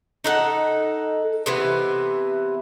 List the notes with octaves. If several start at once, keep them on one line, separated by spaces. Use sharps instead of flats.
D#4 A4 F#5
C3 E3 B3